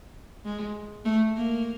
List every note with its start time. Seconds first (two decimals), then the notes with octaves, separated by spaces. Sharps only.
0.45 G#3
1.05 A3
1.36 A#3